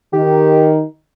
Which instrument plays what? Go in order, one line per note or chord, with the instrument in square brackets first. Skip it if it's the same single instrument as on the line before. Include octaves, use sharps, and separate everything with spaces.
[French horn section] D#3 [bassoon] G4